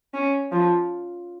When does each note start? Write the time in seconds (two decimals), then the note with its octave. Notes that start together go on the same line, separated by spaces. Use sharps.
0.14 C#4
0.52 F3